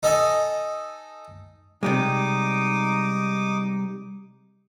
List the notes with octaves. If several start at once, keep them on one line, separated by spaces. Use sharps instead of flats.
D#4 A4 D#5 G#5
C3 G3 G#3 D#4 D6 D#6